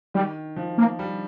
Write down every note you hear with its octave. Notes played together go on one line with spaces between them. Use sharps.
D#3 G3
F3
A#3
G3